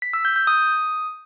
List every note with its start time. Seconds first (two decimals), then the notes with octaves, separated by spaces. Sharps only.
0.02 B6
0.13 E6
0.25 G6
0.36 G6
0.47 D#6